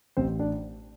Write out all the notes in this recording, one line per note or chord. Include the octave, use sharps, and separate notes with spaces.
A1 C4 C5
D4 D5